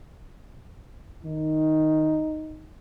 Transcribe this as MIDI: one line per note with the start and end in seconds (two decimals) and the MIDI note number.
1.25 2.20 51
1.25 2.71 63